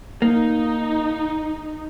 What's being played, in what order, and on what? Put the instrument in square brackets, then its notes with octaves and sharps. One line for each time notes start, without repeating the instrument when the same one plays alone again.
[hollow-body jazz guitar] A#3 [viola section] D#4